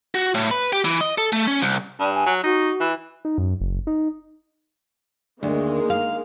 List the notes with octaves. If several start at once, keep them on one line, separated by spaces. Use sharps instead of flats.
F#4
A2
B4
G4
E3
D#5
A4
A3
C#4
C2
G2 D5
G#5
F#3
D#4 F#4
E3
D#4
F#2
F#1
D#4
D2 D#3 G#3 A#3
F5